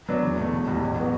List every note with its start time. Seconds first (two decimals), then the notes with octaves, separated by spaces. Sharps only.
0.09 F#3 B3 D4
0.23 E2
0.38 B2 A3
0.53 E1
0.68 E2 B2 G3
0.82 A1
0.98 F#3 B3 F#4